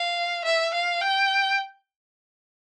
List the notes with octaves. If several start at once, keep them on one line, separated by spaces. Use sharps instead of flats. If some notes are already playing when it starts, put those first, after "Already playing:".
Already playing: F5
E5
F5
G5